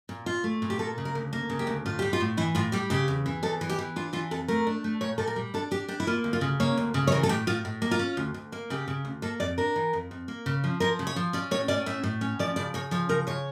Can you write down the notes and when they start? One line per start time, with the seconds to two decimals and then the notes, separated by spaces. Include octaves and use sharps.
0.09 A#2
0.26 A#2 F4
0.44 A3
0.62 A#2
0.70 G4
0.79 A#3 A4
0.98 C#3
1.05 A#4
1.15 D2
1.33 A#3
1.50 C#3
1.59 G4
1.67 D2
1.86 A2 F4
1.99 G3 G4
2.13 F4
2.20 A2
2.37 E3 E4
2.55 A2 F4
2.72 G3 G4
2.90 C#3 G4
3.08 E2
3.26 E3
3.43 E2 A4
3.61 E3
3.70 G4
3.79 E3
3.96 D4 F4
4.13 E3 F4
4.31 F2 A4
4.48 A3 A#4
4.67 D4
4.84 A3
5.01 A#2 C#5
5.18 A#2 A4
5.27 A#4
5.36 G3
5.54 D4 A4
5.71 D4 G4
5.88 D4 G4
6.00 E4
6.07 A#3 F4
6.24 D2
6.33 F4
6.41 C#3
6.60 A#3 C#5
6.77 D2
6.94 C#3
7.07 C#5
7.12 E3 A#4
7.23 A4
7.29 A2 G4
7.47 A2 F4
7.65 A2
7.82 A#3
7.91 F4
7.99 C#4
8.17 D2
8.34 D2
8.52 A#3
8.70 C#3 G4
8.88 C#3
9.05 D2
9.22 A#3 A4
9.40 F2 D5
9.58 D4 A#4
9.76 E3
9.93 F2
10.11 F2
10.28 A#3
10.46 C#3
10.64 F3
10.80 F3 A#4
10.99 C#3
11.07 C#5
11.16 F3
11.33 C#4 D5
11.51 A2 C#5
11.68 C#4 D5
11.86 A2 E5
12.03 A2
12.21 C#4
12.39 F3 D5
12.56 C#3 D5
12.74 C#3 C#5
12.91 F3 C#5
13.09 C#3 A#4
13.27 C#3 C#5